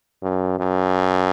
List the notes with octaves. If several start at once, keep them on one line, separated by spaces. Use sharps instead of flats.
F#2
F#2